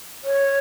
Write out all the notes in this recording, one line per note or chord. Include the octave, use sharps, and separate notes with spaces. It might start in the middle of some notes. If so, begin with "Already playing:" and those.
C#5